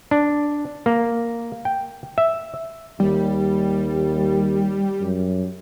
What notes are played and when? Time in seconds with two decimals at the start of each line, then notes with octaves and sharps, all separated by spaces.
0.11 D4
0.86 A#3
1.65 G5
2.18 E5
3.00 D#2 G3
5.01 F#2